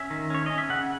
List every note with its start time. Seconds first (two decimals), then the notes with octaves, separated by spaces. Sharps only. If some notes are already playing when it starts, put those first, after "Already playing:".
Already playing: C#4 E5
0.10 D#3
0.30 C#4 C#5
0.46 C#4 D#5
0.58 E5
0.69 C#3 F#5